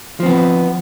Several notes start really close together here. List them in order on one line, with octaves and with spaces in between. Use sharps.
F3 C4 B3